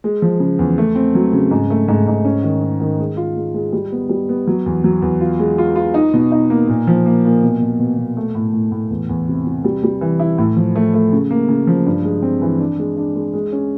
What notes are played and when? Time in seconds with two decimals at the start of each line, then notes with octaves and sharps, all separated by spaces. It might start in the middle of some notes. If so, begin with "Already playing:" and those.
0.04 G#3
0.22 F3
0.40 C#3
0.59 E2
0.78 A3
0.96 C4
1.15 F#3
1.32 C#3
1.51 G#2
1.70 A3
1.88 G#2
2.07 G#2
2.25 C#4
2.43 D#3
2.63 C#4
2.80 D#3
2.99 G#3
3.17 F4
3.36 G#3
3.54 G#3
3.73 G3
3.92 B3
4.09 G3
4.29 B3
4.47 F#3
4.66 E2
4.84 F#3
5.02 E2
5.21 F4
5.39 G#3
5.58 F4
5.76 F4
5.94 D#4
6.14 B2
6.32 D#4
6.50 A#3
6.68 A#2
6.87 F3
7.06 A#3
7.25 A#2
7.42 B2
7.62 B2
7.79 B2
7.97 B2
8.17 A3
8.35 A2
8.53 A2
8.72 A2
8.90 E2
9.09 E2
9.28 C3
9.46 C3
9.64 G3
9.83 G3
10.01 E3
10.20 E4
10.38 A2
10.57 F3
10.76 A3
10.94 A3
11.13 C#3
11.31 A#3
11.49 C#3
11.67 F3
11.86 G2
12.04 G#3
12.22 C4
12.42 E3
12.59 D4
12.78 G#3
12.97 D4
13.15 G#3
13.34 G#3
13.52 C#4